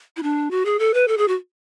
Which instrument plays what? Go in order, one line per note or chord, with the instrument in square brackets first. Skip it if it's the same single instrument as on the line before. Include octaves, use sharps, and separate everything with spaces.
[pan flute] E4
D4
F#4
G#4
A4
B4
A4
G#4
F#4